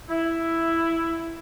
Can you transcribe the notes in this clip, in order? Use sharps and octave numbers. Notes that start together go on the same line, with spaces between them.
E4